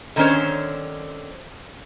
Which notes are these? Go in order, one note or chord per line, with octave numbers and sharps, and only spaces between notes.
D3 D#3 C4 C#4 C5 C#5